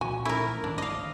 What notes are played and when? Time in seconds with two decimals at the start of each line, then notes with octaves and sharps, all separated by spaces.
0.01 A#2 E3 F3 F#4 G#5
0.25 A3 C#4 E4 A#4
0.64 G#2 D#3 E3 D4
0.78 D5 D#5 F5